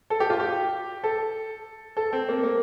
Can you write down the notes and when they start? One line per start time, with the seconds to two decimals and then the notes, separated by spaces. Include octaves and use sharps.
0.10 A4
0.20 G4
0.30 F4
0.40 G4
1.04 A4
1.97 A4
2.13 C4
2.29 A#3
2.44 A#3